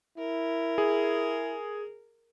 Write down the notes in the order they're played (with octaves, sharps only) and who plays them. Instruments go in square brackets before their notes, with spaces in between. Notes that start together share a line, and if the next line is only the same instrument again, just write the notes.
[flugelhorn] E4 [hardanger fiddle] A#4
[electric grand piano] G#4